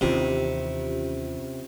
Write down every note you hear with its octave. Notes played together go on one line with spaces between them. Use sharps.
D#2 C3 E3 C#4 F4 G4